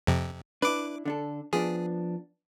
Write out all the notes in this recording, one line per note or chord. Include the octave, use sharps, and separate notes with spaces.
F2 C3
D4 E4 B4 D6
D3 D4 A4
F3 B3 D4 G#4